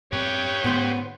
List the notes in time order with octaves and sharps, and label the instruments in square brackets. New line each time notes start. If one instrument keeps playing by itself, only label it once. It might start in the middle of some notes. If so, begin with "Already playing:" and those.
[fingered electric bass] F#2 C4 [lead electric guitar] G4 B4 [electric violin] C#5 G6
[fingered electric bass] G#2 D3 [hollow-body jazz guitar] B3 C5